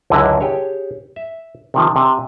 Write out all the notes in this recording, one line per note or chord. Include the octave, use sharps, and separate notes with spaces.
C#2 F#2 D3 E4 D#5 G#5
G4 G#4 C#5
E5
C3 D#3 F3
C3 G#5